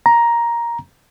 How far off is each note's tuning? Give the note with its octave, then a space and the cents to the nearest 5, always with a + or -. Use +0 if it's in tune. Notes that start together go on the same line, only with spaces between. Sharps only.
A#5 +10